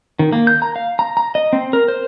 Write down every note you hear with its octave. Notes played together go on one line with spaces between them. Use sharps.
D#3
A#3
G6
A#5
F5
A#5
A#5
D#5
C4
A#4
C5